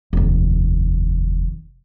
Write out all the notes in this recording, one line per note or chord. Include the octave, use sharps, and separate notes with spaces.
F1 D#2